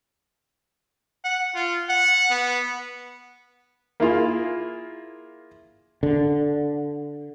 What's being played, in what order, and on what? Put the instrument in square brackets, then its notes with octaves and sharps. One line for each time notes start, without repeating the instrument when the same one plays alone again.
[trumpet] F#5
F4
F#5
B3
[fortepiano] A#3 E4 F4 G#4
[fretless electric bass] D3